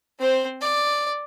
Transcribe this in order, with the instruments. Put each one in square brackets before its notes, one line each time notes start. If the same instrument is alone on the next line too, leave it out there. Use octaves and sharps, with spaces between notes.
[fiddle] C4 C5
D5